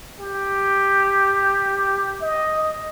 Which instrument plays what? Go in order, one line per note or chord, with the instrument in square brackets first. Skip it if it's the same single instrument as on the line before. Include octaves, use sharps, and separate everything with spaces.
[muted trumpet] G4
D#5